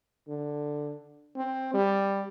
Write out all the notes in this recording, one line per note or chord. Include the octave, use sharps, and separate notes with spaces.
D3
C4
G3